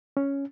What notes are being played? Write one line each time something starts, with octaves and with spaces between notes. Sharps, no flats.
C#4